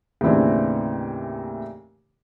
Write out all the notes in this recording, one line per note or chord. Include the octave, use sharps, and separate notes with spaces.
D#2 A2 C#3 E3 C4 D4